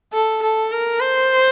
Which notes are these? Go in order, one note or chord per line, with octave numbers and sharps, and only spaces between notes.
A4
A4
A#4
C5